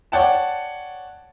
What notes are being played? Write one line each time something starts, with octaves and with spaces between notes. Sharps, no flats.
C#5 D5 F#5 G5 A5